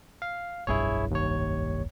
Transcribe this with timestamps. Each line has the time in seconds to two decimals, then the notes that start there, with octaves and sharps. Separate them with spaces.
0.22 F5
0.67 F1 B1 G2 E4 G#4 C#5
1.11 D#2 C#5